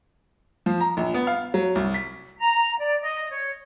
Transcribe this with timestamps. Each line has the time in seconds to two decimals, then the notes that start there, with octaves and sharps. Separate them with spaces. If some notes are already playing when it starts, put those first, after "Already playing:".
0.66 F3
0.81 A#5
0.97 A#1
1.14 B3
1.27 F5
1.54 F#3
1.75 C2
1.94 B6
2.38 A#5
2.79 D5
3.01 D#5
3.30 C#5